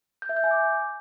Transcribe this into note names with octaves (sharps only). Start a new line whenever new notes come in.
G6
E5
G6
G#5
D6